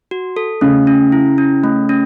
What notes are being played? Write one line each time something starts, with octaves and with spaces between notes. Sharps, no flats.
F#4
A4
C#3 A3
C#4
E4
C#4
A3
C#4